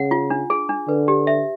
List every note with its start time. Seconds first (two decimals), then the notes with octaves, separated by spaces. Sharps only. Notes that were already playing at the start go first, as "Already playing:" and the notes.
Already playing: C#3 F#5
0.11 F4
0.30 D4
0.50 G#4
0.69 D4
0.88 D3 B4
1.08 G4
1.27 E5